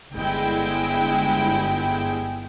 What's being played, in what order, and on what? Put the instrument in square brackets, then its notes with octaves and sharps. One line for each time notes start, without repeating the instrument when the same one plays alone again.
[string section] G1 G#3 E4 G5